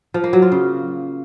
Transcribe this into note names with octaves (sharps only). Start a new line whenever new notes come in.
F3
A#3
F#3
F4
C#3